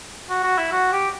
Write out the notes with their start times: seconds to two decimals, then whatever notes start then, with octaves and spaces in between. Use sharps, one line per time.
0.30 F#4
0.44 F#4
0.58 E4
0.72 F#4
0.92 G4